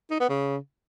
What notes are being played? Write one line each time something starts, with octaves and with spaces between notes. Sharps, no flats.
D#4
B3
C#3